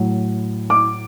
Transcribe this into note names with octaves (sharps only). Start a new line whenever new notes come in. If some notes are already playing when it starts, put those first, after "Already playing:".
Already playing: A2 F#3
D6